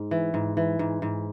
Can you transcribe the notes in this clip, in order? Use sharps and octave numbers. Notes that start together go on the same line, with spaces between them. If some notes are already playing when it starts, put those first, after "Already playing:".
Already playing: G#2
E3
G#2
E3
G#2
G#2